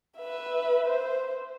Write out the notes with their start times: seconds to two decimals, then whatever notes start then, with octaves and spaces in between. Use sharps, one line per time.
0.19 B4 E5
0.87 C5